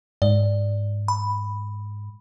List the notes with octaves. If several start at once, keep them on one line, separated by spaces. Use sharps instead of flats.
G#2 D5
B5